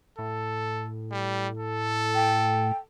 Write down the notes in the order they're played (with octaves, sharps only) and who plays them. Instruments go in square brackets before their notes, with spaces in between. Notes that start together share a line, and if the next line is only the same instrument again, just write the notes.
[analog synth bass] A2 [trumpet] A4
[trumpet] G3
A4
[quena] G5